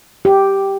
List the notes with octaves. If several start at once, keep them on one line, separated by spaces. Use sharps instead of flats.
G4